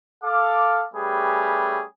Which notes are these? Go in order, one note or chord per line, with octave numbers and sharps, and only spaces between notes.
A4 F5 D6
G3 A3 C#4 G4 G#4 B4